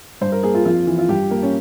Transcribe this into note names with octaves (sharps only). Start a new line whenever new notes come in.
G2 C5
A#4
A#3 G#4
F4
F2 F4
E3
F4
G2 G4
A#3
C#4